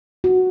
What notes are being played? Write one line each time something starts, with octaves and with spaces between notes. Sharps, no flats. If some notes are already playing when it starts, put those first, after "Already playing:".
F#4